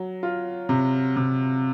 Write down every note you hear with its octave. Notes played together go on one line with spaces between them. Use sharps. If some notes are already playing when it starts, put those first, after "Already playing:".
Already playing: F#3
F4
C3
C3